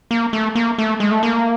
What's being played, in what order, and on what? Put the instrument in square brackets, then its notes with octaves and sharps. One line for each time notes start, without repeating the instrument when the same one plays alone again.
[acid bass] A#3
A3
A#3
A3
G#3
A3
A#3